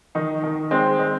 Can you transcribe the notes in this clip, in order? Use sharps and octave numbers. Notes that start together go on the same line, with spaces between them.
D#3 D#4
D#3
G#3 C4
G#3